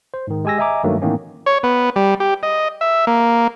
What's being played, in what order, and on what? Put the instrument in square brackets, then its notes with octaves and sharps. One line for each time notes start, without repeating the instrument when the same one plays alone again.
[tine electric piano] C5
G#2 D#3
G#3 G4 G#5 E6 A#6
D#5 E5 G#5 A#5 D6
G2 D#3 F#3 A3 A#3
A2 D#3 E3 A#3 B3 C#4
[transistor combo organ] C#5
B3
G3
G4
D#5
E5
A#3